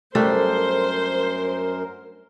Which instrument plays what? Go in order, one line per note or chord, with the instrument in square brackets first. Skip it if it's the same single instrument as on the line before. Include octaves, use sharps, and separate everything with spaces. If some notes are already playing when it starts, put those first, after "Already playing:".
[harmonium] F#2 A#4 [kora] G3 A3 D4 [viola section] C5